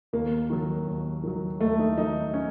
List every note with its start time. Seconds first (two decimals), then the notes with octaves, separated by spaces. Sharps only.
0.13 D#2 A#3
0.50 D#3 F#3
0.87 D#2
1.23 D#3 F#3
1.60 D#2 A3
1.79 D#4
1.97 D#3 F#3 D#4
2.34 C#4